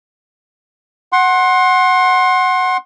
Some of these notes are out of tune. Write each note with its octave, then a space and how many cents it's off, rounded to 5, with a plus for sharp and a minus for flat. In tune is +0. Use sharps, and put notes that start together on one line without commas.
F#5 +0 C6 +25